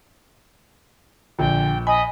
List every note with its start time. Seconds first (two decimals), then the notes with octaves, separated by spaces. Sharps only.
1.39 A#1 D3 G5
1.87 D#5 G#5 B5